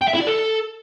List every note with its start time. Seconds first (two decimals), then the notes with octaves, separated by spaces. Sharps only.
0.02 G5
0.08 E5
0.14 E4
0.21 D5
0.27 A4